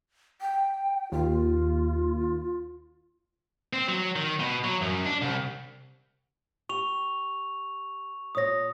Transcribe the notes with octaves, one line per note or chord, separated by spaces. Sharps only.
G5
D#2 F4
C4
F#3
D#3
B2
F#3
F#2
D4
C2
G4 C#6 F7
A#2 C#5 D#6 A#6